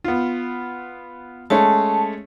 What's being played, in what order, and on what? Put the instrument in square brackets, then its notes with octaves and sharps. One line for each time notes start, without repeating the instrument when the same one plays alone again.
[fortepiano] B3 F4
[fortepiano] G#3 A3 C#4 [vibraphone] A5